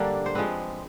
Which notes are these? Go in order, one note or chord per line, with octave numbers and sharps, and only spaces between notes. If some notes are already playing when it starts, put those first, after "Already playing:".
Already playing: D3 G3 A#3 D4
C5
F3 G#3 C4 B4